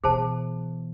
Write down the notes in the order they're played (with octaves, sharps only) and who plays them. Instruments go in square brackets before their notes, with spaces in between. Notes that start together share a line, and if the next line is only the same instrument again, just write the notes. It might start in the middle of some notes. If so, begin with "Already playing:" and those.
[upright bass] B2 E3 [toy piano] G#4 C5 A5